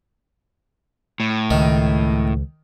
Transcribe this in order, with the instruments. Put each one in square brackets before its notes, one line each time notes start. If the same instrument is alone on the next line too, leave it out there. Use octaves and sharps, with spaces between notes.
[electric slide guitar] A2
[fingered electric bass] C#2 [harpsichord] D#3